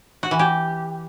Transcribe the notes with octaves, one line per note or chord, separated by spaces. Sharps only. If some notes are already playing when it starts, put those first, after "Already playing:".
F#4
E3
G4